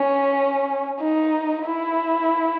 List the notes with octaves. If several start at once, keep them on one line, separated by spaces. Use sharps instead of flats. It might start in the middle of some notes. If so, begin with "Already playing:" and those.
Already playing: C#4
D#4
E4